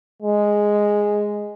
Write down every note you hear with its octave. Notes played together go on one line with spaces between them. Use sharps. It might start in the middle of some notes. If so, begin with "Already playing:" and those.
G#3